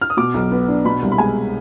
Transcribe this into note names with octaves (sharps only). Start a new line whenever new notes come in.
F6
D#6
B2 D6
B1
B3
D4
B2 B5
C2
B5
G#3 G#5